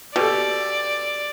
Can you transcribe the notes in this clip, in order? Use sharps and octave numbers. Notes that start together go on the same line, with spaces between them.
B2 G4 A4 D5